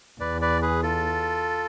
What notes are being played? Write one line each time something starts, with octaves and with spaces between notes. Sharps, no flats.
E2 B4 D5
B4 D5
G#4 B4
F4 A4